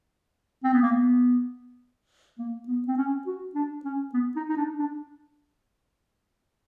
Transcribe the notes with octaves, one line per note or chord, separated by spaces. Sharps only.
C4
B3
A#3
B3
A#3
B3
C4
C#4
F#4
D4
C#4
B3
D#4
D#4
D4
D4